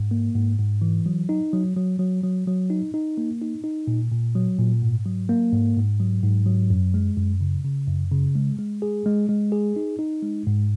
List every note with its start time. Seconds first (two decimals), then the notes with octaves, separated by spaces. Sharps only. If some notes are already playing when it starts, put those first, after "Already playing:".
Already playing: G#2
0.11 A#3
0.35 G#2
0.59 G#2
0.82 E3
1.06 F#3
1.29 D#4
1.53 F#3
1.77 F#3
1.99 F#3
2.24 F#3
2.47 F#3
2.70 D#4
2.94 D#4
3.18 A#3
3.41 D#4
3.64 D#4
3.87 A#2
4.11 A#2
4.35 F#3
4.59 A#2
4.82 G#2
5.06 F#3
5.29 A#3
5.52 G#2
5.76 G#2
6.00 F#3
6.23 G#2
6.46 F#3
6.70 F#2
6.94 G#3
7.17 F#2
7.41 C#3
7.64 C#3
7.87 F#2
8.12 C#3
8.35 G#3
8.59 G#3
8.82 G#4
9.06 G#3
9.29 G#3
9.52 G#4
9.76 D#4
9.99 D#4
10.22 G#3
10.47 G#2